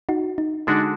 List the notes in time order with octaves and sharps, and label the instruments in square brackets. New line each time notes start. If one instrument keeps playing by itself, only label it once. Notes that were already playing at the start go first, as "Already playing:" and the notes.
[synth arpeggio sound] D#4 F#4
D#4
[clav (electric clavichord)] D3 G#3 D4 F#4 D5 [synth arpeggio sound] D#4